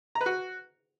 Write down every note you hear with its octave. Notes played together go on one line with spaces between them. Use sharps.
A#5
B4
F#4